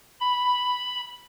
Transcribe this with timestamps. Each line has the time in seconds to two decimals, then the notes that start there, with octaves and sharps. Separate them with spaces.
0.20 B5